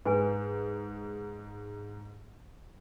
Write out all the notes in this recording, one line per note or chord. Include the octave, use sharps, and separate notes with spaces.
G#2 B4 G#5